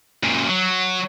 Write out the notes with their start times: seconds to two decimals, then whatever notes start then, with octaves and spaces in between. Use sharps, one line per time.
0.23 F#2 A#2
0.49 F#3